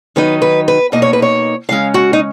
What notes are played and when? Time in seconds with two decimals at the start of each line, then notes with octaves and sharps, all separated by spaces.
0.16 D#3 F#3 B3 D#4 B4
0.42 B4
0.68 B4
0.92 B2 A#3 D#4 D#5
1.02 C#5
1.13 B4
1.22 C#5
1.69 C#3 G#3 C#4 F5
1.94 F#4
2.13 D#4